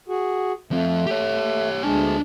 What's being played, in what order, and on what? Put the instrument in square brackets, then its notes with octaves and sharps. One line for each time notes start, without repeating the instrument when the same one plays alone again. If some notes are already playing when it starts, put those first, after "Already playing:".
[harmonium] F#4 G#4
[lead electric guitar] F3 C4 [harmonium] A3
[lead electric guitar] G4 C#5
[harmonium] D2 G#3 A5 [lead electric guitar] D4 G#5